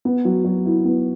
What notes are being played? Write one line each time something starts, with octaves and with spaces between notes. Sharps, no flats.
B3
F#3
F#3
E4
B3